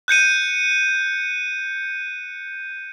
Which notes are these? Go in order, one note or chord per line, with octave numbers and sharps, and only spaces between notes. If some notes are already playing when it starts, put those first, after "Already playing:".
F#6 G6 C#7 D#7